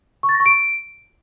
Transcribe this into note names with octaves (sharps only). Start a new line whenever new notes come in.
C#6
A6
A#6
C#6
D7